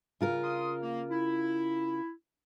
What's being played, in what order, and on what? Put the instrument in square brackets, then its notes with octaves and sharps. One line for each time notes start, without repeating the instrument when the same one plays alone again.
[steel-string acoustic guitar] C#3 F4 A#4
[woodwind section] C6 D#6
A#3
E4